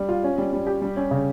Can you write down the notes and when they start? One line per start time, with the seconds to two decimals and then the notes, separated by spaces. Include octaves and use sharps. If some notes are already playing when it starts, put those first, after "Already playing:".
Already playing: G3
0.09 F4
0.24 C#4
0.38 G3
0.53 G3
0.67 G4
0.82 G3
0.97 C#4
1.11 C#3